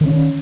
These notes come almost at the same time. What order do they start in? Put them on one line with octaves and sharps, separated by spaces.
D#3 C4 C#4